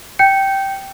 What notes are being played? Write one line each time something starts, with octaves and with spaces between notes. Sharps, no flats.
G5 G6 C#7